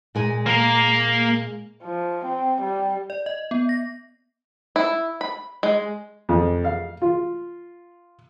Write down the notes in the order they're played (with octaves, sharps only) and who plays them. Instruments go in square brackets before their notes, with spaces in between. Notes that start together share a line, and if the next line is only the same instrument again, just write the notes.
[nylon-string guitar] A#2 G#3 G#5
[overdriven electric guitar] A#3 A#4
[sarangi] F3
C4
G3
[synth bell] D5
D#5
B3
A#6
[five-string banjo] E4
B5
G#3
[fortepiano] F2
F5
F4